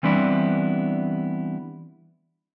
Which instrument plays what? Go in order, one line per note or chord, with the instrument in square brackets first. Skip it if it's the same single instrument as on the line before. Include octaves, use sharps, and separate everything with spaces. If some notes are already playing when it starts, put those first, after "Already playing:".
[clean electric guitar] E3 G3 B3 C4 D4 E4